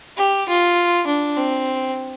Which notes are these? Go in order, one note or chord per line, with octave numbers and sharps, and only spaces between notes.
G4
F4
D4
C4